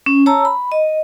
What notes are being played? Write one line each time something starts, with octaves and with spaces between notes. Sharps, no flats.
C#4
C#5 A5 A#5 E6
B5
D#5